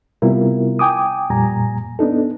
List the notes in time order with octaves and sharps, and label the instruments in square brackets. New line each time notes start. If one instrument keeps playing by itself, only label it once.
[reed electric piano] C3 G3 B3 E4 F4 A#4
G5 G#5 D6 D#6
F2 A#2 G3 G#5 A#5
B3 D4 D#4 A4